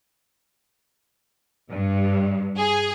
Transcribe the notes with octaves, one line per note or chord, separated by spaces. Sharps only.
G2
G#4